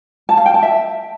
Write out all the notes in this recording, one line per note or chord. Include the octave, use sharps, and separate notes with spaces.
A5
F5
G5
A5
E5